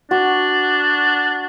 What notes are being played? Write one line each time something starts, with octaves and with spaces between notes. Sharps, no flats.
D4 F#4